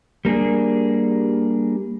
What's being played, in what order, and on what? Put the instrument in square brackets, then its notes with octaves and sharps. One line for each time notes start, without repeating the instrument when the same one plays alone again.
[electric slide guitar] G3 A#3 D4 G#4